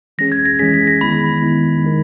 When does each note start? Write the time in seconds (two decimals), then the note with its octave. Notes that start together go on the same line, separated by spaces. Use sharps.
0.18 E3 G#3 C#4 G#4 A#6
0.32 G#6
0.46 A#6
0.59 E3 G#3 C#4 G#4 B6
0.74 B6
0.87 A#6
1.01 D#3 G#3 B3 E4 B5
1.42 D#3 G#3 B3 E4
1.84 D#3 G#3 D#4 A#4